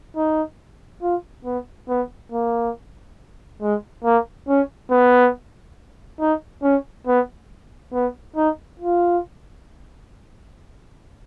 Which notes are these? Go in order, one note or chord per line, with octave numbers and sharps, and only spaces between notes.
D#4
F4
B3
B3
A#3
G#3
A#3
C#4
B3
D#4
C#4
B3
B3
D#4
F4